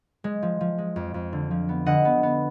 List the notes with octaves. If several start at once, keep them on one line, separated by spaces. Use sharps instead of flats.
G#3
F3
F3
G#3
F2
F2
D3
F3
B3
D3 D#5 F#5
B3
B3